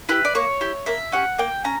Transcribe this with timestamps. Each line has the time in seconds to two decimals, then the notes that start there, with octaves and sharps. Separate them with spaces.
0.09 E4 G4 B4
0.25 D5
0.35 A#3 C#5
0.61 E4 G4
0.86 A#3 E5
1.12 C#4 G4 F#5
1.38 A#3 G5
1.64 C#4 A#5